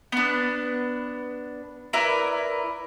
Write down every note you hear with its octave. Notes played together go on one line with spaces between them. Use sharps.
B3 D4
E4 A#4 B4 D5